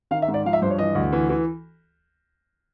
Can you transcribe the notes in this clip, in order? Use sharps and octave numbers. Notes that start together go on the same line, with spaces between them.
D#3 F5
E5
G#2
D5
F3 F5
E5
G2 C5
C#5
E3 D#5
D2
E3
E3